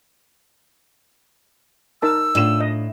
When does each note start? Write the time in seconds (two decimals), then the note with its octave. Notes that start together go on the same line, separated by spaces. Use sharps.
2.02 D#4 A#4 A5 E6
2.35 A2 D4 F4 E7
2.61 D#5